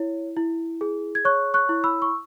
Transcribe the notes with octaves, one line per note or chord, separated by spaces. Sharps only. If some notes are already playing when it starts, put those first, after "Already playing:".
Already playing: E4 C#5
E4
G#4
G#6
C#5 C#6 F#6
C#6 F#6
E4
B5 E6
C#6